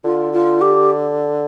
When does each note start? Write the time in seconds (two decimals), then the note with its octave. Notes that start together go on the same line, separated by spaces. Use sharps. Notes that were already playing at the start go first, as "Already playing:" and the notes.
0.04 D3 F4
0.33 F4
0.61 G4